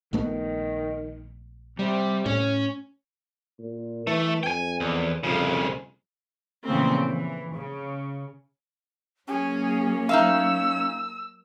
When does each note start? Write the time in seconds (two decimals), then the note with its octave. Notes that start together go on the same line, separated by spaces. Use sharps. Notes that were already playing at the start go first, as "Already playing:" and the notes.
0.13 A#1 D#3 A3 B3
1.79 C3 G3
2.26 A2 C#4 C#5
3.59 A#2
4.07 E3 A3
4.43 F2 G5 G#5
4.80 E2
5.24 C2 F2 C#3
6.65 A#2 C#3 E3 F3 A3 C4
7.04 E3
7.54 C#3
9.28 F#3 A#3 C#4 G#4
10.09 D#4 E5 F5 E6